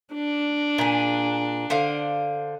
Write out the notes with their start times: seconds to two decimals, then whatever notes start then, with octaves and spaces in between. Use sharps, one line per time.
0.14 D4
0.78 A#2 G#4
1.70 D3 C5 F5